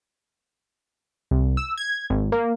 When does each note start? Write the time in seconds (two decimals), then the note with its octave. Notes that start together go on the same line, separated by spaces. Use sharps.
1.31 C2
1.57 E6
1.77 G#6
2.10 G#1
2.32 A#3